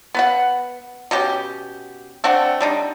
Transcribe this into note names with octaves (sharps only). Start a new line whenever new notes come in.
B3 B4 F#5
B2 C#4 G4
A3 C4 D4 F#5
G3 D4 D#4